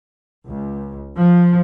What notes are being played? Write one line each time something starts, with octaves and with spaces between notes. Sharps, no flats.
C#2
F3